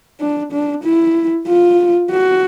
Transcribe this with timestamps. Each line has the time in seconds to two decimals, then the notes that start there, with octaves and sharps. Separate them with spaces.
0.21 D4
0.52 D4
0.84 E4
1.48 F4
2.11 F#4